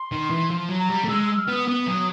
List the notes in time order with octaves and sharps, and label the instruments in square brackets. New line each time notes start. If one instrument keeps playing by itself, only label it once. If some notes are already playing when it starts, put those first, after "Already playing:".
Already playing: [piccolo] C6
[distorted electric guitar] D#3
E3
F3
F#3
[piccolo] A#5
[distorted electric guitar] G3
A3
[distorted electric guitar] G#3 [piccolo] E6
[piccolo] E6
F6
[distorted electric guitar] B3 [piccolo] D#6
[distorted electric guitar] B3 [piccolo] D#6
[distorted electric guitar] F#3